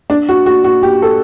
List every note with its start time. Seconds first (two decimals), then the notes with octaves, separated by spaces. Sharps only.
0.10 D4
0.29 F#4
0.46 F#4
0.64 F#4
0.83 G4
1.02 A4